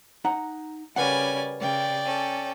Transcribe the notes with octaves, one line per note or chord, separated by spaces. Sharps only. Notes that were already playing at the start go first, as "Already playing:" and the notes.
D#4 F#5 A#5
C#3 G3 C#4 A#4 B4 D5 F#5 G#5
C#3 D5 G5
C#4 A4